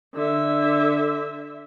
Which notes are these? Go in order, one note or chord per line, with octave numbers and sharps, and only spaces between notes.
D3 E5